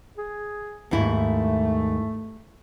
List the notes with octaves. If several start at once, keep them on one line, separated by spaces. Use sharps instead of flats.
G#4
D#2 G#2 A3 E4